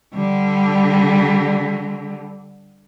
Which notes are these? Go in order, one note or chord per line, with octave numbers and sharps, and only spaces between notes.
D3 G3